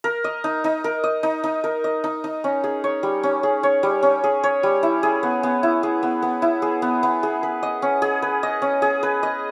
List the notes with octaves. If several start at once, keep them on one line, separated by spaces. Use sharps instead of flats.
A#4
D#5
D#4
D#4
A#4
D#5
D#4
D#4
A#4
D#5
D#4
D#4
C#4
G#4
C#5
G3
C#4
G#4
C#5
G3
C#4
G#4
C#5
G3
E4
G#4
B3
B3
E4
G#4
B3
B3
E4
G#4
B3
B3
G#4
B4
D#5
C#4
G#4
B4
D#5
C#4
G#4
B4
D#5